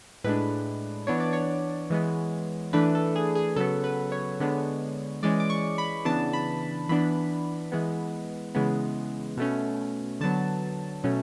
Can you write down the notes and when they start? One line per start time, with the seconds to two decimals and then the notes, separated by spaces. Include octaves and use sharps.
0.24 A2 G#3 D4 B4
1.07 E3 B3 D4 C#5
1.20 D5
1.33 C#5
1.90 E3 G#3 B3
2.73 E3 A3 D4 B4
2.95 A4
3.16 G#4
3.35 G#4
3.56 C#3 F#3 B3 A4
3.84 B4
4.12 C#5
4.40 D3 G#3 B3 D4
5.23 E3 G#3 C#4 D5
5.40 D6
5.50 C#6
5.78 B5
6.05 C#3 E3 B3 D4 A5
6.33 B5
6.89 E3 B3 D4 B5
7.72 E3 G#3 B3
8.55 C#3 E3 G#3 B3
9.37 B2 A3 C#4
10.20 D3 F#3 B3 A5
11.04 B2 F#3 A3 C#4